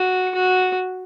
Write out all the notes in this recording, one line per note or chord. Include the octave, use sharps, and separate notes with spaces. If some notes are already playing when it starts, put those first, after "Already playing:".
Already playing: F#4
F#4